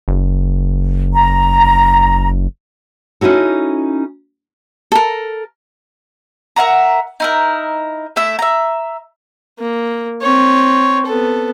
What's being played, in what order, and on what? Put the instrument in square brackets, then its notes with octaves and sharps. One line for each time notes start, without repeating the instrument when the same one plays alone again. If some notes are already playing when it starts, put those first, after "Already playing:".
[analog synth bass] F#1
[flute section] A#5
[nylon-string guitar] C#4 D#4 E4 F#4 A4
[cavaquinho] A4 A#4
[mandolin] A#4 E5 F#5 A#5
D#4 E4 A#4
A3 E4 E5
E5 A#5
[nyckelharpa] A#3
C4 C#5
B3 A4